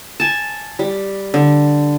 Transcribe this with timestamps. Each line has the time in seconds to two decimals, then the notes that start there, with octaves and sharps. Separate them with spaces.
0.20 G#5 A5
0.79 G3
1.34 D3